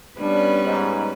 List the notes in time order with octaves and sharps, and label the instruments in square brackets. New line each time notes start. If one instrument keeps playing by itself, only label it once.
[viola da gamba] G3 B3 [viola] C#4 B4 [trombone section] D4
[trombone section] G#2